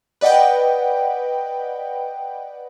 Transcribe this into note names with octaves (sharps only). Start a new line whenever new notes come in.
B4 D5 D#5 F#5 G5